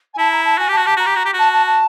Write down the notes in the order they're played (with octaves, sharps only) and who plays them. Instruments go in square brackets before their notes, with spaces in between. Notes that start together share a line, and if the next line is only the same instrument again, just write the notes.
[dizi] G#5
[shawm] E4 [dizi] A5
[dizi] A#5
A5
[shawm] F#4 [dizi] G#5
[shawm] G4 [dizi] A5
[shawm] F#4
[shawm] G4 [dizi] A5
[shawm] F#4 [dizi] A#5
[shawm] G4
F#4
G4
[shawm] F#4 [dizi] A5
[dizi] A5
A5